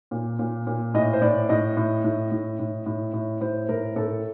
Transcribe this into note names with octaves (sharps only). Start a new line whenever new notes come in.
A#2
A#2
A#2
A2 D#5
C5
A2 D5
A2 D#5
A2
A2
A2
A2
A2
A2
A2 C5
A2 A#4
A2 A4